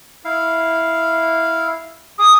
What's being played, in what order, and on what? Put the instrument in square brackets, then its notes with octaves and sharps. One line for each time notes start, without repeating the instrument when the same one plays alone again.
[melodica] E4 F5
[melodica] G#4 D6 [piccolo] D#6